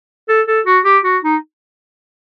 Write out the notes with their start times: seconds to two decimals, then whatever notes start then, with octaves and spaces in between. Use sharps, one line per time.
0.29 A4
0.47 A4
0.66 F#4
0.85 G4
1.04 F#4
1.23 D#4